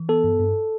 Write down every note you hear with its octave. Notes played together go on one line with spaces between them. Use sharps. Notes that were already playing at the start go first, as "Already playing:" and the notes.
Already playing: E3
B3 A4
G2
G2